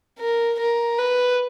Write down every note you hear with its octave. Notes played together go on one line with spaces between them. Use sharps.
A#4
A#4
B4